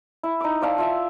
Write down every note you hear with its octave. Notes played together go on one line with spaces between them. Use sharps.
E4
D#4 D6
C5 D5 F5 A5
F4 E5 F5